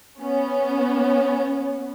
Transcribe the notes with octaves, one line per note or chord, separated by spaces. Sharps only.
B3 C#4